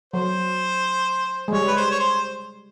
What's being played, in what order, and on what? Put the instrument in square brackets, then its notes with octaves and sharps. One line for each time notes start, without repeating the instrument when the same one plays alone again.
[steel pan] F#3 [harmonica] C5
[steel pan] G#3
[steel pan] G3 [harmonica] C#5
[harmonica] B4
C5
C#5
C5